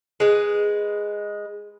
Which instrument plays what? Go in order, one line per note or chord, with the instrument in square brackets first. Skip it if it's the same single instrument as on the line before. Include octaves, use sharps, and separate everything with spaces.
[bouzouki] G#3 B4